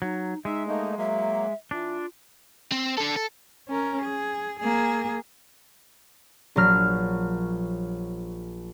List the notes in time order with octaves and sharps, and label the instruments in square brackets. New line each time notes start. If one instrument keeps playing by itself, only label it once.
[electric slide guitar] F#3 [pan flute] D#4
[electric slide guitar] G#3 [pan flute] D#4 [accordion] E5
[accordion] A3 A#3 D#4 [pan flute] D#5
[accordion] F#3 A#3 [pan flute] E5
[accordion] E3 [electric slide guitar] D4 [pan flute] F4
[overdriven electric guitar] C4
D3 A4
A4
[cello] C#4 A#4
G#4
A#3 G#4
[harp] A#1 F#3 F6